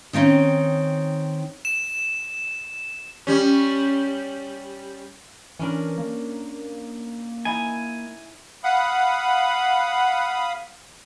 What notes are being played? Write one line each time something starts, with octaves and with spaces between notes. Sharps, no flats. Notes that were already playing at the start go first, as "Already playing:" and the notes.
D#3 C4 C#4 D#4
E7
G3 C#4
E3 C#4 D4 A#4
A#3
D#4 E4 G#5
F5 F#5 B5 D#6